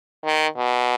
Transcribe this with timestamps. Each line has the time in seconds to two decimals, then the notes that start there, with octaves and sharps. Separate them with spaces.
0.25 D#3
0.57 B2